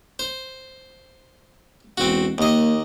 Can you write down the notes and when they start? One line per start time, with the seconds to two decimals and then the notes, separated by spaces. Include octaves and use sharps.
0.19 C5
1.98 E1 C4 F#4
2.38 D#2 A#3 D#5